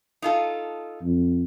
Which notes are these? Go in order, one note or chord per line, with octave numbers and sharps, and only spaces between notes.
D#4 F4 A4
F2